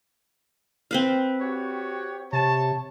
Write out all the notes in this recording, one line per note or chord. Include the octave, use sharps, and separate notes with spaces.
C4 B4 F5
F#4 G4 C#5
C3 C#5 A5